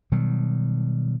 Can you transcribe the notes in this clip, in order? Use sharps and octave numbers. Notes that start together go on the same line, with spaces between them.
B2 D#3 F#3 G3